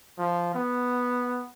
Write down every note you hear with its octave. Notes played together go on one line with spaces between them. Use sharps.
F3
B3